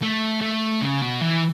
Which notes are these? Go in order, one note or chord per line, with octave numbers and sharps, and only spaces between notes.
A3
A3
C#3
B2
E3